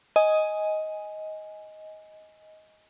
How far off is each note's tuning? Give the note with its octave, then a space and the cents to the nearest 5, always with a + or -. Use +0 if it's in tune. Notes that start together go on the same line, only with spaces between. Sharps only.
D#5 +10 G#5 +0